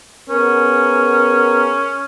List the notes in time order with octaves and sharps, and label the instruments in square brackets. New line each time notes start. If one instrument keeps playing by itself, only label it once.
[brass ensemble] B3 G#4 A#4 [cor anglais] C#4